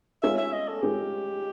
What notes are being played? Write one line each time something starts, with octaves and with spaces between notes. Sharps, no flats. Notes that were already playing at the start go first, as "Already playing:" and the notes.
G#3 C#4 F4 G#4 E5
E5
D#5
A4
G#3 C#4 F4 G4 G#4